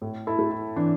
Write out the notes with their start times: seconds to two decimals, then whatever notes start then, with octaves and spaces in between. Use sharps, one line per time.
0.02 A2
0.27 E4 A4
0.39 A3
0.51 E4
0.76 E3 D4